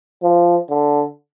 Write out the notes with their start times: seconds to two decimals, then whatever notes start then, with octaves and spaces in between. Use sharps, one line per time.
0.22 F3
0.69 D3